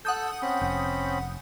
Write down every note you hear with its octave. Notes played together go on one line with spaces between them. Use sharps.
A4 F#5 D#6 E6 G6
C4 C#4 B5
F1